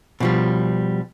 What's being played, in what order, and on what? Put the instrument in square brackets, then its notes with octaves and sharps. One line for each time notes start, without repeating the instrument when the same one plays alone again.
[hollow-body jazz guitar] B2 F3 G3